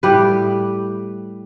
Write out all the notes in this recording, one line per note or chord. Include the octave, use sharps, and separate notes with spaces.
A2 G3 G4 B4